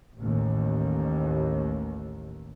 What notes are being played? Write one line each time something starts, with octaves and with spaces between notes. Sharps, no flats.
A1 D#2